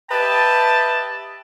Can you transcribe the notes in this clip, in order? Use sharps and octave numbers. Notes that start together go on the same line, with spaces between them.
G4 B4 D#5 E5 G5 A5